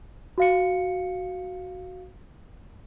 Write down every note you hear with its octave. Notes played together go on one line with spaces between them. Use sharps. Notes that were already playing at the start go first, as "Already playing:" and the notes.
F#4 F5 C#7